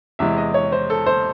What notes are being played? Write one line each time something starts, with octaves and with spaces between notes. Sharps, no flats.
E2 C3 E3 G#3 E5
D#5
C#5
C5
A4
C5